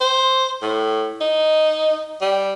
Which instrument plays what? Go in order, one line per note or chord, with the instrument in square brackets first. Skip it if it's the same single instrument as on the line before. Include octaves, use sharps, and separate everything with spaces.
[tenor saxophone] C5
A2
D#4
G3